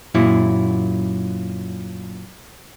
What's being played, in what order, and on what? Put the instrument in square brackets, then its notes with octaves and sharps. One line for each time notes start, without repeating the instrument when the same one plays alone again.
[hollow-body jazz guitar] F#2 A#2 E4